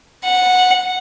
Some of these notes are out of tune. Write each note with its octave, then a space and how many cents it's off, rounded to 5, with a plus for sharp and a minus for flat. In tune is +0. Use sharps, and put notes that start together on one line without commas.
F#5 -10